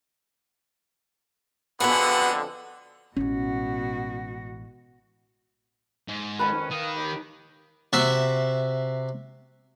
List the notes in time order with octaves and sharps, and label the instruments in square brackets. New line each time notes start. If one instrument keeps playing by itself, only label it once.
[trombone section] F2 D3 [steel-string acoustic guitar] B3 F#4 G#4 [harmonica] F#5 B5
[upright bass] A1 G#3 [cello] B2 F#4 [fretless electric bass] C#4
[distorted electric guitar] G#2
[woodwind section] F2 D#3 C#4 [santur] B4 A5
[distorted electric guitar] D#3 [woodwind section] F5 D#6
[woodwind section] D#2 G4
[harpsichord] C3 F#4 E5 A5